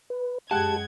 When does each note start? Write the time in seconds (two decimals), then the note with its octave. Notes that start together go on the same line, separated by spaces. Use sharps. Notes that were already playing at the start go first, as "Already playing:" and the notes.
0.10 B4
0.51 F#2 G#3 G4 F#5 G5 A5 F#6 G#6